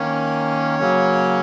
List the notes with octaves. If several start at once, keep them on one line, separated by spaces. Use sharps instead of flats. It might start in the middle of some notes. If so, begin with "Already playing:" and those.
Already playing: D#3 A#3 C#4 C#5
C#3 F#3 A#3 C#4